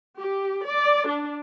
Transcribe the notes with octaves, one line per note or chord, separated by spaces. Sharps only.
G4
D5
D4